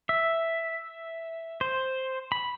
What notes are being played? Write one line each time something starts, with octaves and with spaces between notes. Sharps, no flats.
E5
C5
B5